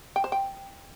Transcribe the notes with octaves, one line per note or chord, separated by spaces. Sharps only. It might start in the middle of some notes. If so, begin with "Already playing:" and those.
G5
C5
G5